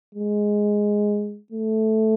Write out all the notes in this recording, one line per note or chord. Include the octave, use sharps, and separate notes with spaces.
G#3
A3